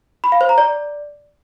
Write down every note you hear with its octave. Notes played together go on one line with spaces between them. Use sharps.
B5
F5
C5
A#5
D5